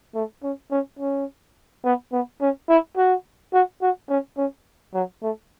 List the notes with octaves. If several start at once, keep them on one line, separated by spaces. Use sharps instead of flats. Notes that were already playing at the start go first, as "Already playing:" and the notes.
A3
C#4
C#4
C#4
B3
B3
C#4
E4
F#4
F#4
F#4
C#4
C#4
F#3
A3